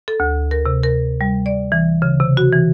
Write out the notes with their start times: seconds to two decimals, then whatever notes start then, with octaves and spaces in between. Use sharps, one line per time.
0.08 A4
0.20 D2
0.51 A#4
0.66 C3
0.83 A#4
1.21 G3
1.46 D5
1.72 E3
2.02 C#3
2.20 C3
2.37 F#4
2.53 E3